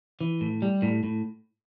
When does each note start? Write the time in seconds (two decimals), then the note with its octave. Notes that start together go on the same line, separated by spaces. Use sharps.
0.21 E3
0.41 A2
0.62 G3
0.82 A2
1.04 A2